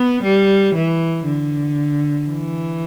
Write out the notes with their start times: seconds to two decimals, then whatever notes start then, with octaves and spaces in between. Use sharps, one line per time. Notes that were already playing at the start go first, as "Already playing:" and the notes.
Already playing: B3
0.23 G3
0.75 E3
1.25 D3
2.28 E3